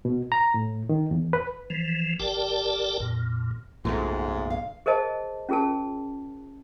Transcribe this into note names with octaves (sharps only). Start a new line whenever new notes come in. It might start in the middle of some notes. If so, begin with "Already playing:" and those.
B2
A#5
A2
D#3
E2
B4
E3 F3
G1 G4 A#4 D5 G5 A5
F2 A#2
F#1 B1 G#2 B2 A3 F4 F#4
F5
G#4 A#4 C5 D#5 A5
C#4 F4 G#4 A#4 A5